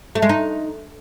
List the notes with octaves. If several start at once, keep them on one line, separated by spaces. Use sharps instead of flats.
A3
G#3
D#4